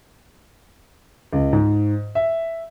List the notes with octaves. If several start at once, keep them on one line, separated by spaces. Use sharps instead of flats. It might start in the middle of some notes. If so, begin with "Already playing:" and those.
C#2
G#2
E5